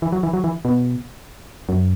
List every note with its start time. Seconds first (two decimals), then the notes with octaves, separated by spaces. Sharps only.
0.02 E3
0.12 F#3
0.23 E3
0.33 F#3
0.44 E3
0.65 B2
1.69 F#2